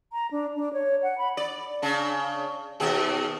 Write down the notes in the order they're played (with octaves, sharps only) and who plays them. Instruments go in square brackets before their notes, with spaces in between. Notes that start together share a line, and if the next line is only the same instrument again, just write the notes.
[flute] A#5
D4
D4
C#5
F#5
B5
[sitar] D5
C#3 D4
D#2 B2 G#4